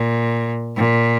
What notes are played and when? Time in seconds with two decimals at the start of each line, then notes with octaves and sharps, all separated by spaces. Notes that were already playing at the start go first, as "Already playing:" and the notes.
Already playing: A#2
0.76 A#2